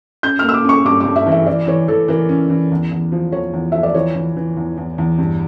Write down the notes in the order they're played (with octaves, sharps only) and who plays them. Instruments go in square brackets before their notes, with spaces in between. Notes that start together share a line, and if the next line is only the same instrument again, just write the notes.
[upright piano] C#4 [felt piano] G6
[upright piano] A#3 [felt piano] F6
[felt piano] E6
D6
[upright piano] C#4 [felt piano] C#6
[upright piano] G2 [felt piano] D6
[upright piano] G2 [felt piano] D6
[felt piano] E5
[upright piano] E3
[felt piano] E5
[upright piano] E3 [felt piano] D5
[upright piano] E3 [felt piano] C#5
[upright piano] E3 [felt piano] A4
[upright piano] E3 [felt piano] A#4
[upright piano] C#4
E3
E2
E2
F3
[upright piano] E2 [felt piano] C#5
[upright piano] E2
[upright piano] F3 [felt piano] E5
[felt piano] D5
[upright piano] E3 [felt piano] C#5
[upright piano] E3
E3
E2
E2
E2
G2